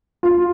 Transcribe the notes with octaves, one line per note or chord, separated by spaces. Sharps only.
F4